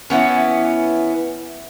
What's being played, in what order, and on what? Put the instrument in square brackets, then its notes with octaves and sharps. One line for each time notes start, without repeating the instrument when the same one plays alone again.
[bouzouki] E3 B3 C#4